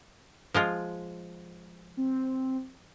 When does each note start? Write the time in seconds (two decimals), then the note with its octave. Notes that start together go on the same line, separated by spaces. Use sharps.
0.54 F3 G#3 F4
1.97 C4